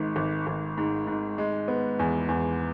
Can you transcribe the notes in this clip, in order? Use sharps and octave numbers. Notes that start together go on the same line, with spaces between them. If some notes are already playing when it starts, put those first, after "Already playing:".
Already playing: G#1 G#2
G#1
G#1
G#2
G#2
G#3
B3
E2
E2